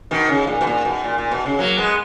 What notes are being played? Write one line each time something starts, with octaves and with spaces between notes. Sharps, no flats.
B2 D#3
C#3
A#2
B2
A#2
B2
A#2
A#2
B2
C#3
F#3 A#3
G#3 B3